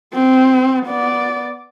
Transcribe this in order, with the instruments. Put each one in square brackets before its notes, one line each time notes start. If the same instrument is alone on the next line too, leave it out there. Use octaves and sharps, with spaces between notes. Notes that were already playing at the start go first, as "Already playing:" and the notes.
[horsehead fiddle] C4
B3 D5